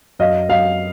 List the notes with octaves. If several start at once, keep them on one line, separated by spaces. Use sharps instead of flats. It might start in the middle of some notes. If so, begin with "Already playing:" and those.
F#2 D#5 F5
F#2 D#5 F5